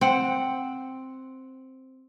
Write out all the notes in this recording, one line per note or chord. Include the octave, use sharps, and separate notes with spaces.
C4 F#5